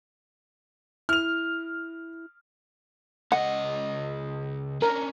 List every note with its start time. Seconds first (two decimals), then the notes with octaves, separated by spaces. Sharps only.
1.09 E4 F6 F7
3.32 C#2 D#5 F#5
4.82 C#4 D4 A#4